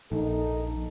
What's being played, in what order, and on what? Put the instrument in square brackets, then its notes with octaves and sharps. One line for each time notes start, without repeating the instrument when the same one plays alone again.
[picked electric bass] A#1 [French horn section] D#4 A4